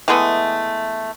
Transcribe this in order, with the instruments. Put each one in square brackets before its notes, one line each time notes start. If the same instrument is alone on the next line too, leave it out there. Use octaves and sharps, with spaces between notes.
[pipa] E3 G#3 A3 B3